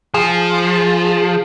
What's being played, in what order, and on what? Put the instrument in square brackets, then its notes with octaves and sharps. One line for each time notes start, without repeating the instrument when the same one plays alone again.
[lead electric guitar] F3 [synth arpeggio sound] G#4